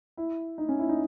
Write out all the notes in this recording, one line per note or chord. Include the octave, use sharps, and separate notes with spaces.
E4
D#4
C#4
E4
D#4